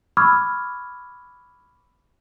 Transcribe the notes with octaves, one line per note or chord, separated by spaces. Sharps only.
B5 C#6 D6 E6 F6 G#6